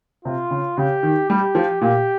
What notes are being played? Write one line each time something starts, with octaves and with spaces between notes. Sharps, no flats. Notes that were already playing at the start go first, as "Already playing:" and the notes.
C3 F4
C#3
C#3 G4
D#3
G3 G4
F3
A#2 G4